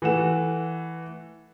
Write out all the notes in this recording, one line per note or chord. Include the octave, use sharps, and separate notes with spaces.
E3 A3 F#5 E7